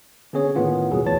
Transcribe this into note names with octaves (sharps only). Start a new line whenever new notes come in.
D3 B3 C#4 G#4 C#5
A2 D#3 A#3 B3 F4
E2 B2 F#3 G3 G#4
D2 E3 C#5 A5 A6